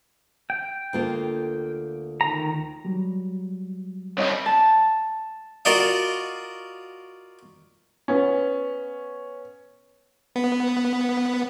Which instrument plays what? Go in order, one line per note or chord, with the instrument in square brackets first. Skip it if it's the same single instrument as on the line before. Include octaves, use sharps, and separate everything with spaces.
[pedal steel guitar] G5
[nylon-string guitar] D2 A#3 F4
[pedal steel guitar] D#3 A#5
[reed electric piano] F#3 G3
[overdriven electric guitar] C2 G3 [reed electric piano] C#5 D#5
[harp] A5
[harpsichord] F4 F#4 A#4 D5 D#5 F5
[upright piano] B3 C#4
[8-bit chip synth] B3